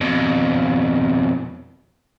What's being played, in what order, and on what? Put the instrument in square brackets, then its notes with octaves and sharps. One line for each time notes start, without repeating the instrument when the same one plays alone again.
[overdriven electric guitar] F2 B2